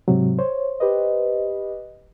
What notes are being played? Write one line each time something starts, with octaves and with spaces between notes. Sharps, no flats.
G#2 C3 F#3
C5 C#5
G4 B4 D#5